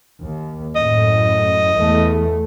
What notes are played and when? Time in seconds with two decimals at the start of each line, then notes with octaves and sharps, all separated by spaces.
0.23 D#2
0.76 F#2 A2 D#5
1.77 E2 A3